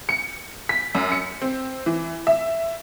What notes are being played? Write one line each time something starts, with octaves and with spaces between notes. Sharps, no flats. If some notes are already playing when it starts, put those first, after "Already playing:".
C#7
B6
F#2
C#7
C4
E3
E5